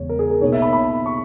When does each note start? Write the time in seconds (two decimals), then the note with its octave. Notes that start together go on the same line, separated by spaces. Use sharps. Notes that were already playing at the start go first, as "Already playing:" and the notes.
Already playing: E2 C#3 G#3 B3 C#5
0.09 A#4
0.19 G#4
0.30 A#4
0.41 B2 A#3 D#4 C#5
0.52 E5
0.62 B5
0.73 B5
1.06 C#6